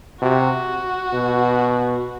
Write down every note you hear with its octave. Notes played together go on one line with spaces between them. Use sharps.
C3 F#4
B2